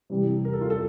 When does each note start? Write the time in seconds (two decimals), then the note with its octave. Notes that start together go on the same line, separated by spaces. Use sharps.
0.10 C3 E3 G3
0.45 A#4
0.53 A4
0.61 F4
0.70 A4